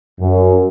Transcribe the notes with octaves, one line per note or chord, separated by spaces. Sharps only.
F#2